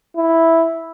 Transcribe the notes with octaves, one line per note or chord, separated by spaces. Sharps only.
E4